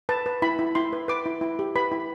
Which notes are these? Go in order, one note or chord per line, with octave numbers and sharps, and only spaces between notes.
B4 A5
B4
E4 B5
E4
E4 C6
B4
B4 D6
E4
E4
G4
B4 B5
E4